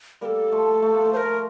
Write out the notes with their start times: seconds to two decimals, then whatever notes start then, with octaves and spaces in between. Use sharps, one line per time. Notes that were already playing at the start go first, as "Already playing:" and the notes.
0.21 G3 A#3 A4 A#4
0.52 F3 A3
0.82 A3
0.94 A#3
1.05 F3 A3
1.13 C5
1.17 A#4